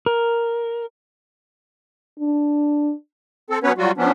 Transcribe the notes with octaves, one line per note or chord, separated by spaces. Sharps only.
A#4
D4
C4 A4
F#3 B3 C#4 B4 C#5
F#3 G3 F4 F#4
F3 F#3 B3 C#4 D4